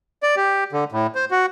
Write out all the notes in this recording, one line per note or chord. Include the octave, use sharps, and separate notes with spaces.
D5
G4
D3
A2
C5
F#4